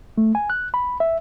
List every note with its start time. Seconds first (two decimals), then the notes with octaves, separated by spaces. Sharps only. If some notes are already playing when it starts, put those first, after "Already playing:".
0.18 A3
0.35 G#5
0.50 F#6
0.74 B5
1.00 E5